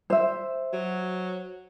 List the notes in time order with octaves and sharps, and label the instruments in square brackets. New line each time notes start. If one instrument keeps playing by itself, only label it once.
[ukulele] C5 E5
[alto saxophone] F#3